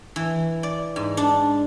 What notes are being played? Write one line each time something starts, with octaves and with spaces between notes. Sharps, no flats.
E3
D5
G#2
D4